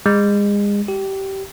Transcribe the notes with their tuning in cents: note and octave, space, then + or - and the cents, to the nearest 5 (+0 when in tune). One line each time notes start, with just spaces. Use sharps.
G#3 -30
G4 -20